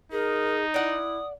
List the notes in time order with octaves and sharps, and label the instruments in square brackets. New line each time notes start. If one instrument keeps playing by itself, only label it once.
[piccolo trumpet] D#4 [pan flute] G#4 [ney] A#4
[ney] E4 [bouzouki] D5 F#5 [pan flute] D#6